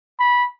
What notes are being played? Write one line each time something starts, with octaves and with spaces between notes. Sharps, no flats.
B5